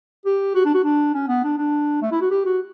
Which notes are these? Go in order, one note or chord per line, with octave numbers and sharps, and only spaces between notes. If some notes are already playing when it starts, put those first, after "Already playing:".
G4
F#4
D4
F#4
D4
C#4
B3
D4
D4
A3
E4
F#4
G4
F#4